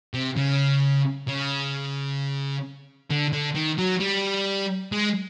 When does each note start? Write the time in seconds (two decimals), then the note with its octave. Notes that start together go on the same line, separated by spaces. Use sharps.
0.14 C3
0.37 C#3
1.28 C#3
3.10 D3
3.33 D3
3.55 D#3
3.79 F#3
4.01 G3
4.92 G#3